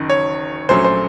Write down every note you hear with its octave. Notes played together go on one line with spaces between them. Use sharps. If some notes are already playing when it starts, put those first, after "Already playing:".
Already playing: F#1 F#2 D#3
C#5
A#1 A#2 F#3 A3 C#4 C5
C5